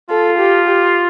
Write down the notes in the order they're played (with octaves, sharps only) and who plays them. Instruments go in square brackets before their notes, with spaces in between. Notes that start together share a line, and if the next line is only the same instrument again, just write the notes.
[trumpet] F4 [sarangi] A4
[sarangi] G4
G4